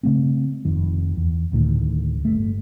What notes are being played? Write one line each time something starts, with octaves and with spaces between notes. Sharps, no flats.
C#3 A3 C4
F1 F2 D#3
E2
D1 D2 A2 D#3
G1 A3